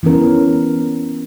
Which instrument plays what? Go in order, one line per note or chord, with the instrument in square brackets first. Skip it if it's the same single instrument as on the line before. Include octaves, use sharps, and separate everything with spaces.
[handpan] E3 B3 C#4 A#4